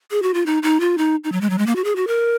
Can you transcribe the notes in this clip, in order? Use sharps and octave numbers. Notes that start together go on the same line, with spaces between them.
G#4
F#4
F4
D#4
D#4
F4
D#4
D#4
F#3
G#3
F#3
G#3
A#3
F#4
G#4
F#4
A#4